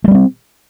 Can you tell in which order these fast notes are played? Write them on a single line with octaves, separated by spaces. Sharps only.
A3 G3 B3 C4